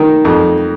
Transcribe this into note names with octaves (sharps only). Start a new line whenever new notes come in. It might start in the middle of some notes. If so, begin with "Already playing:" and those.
Already playing: D#3
F2